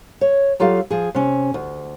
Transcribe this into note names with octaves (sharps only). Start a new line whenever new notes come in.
C#5
F#3 F4 G4 A4 F5
F3 G#4
C3 C#4
D2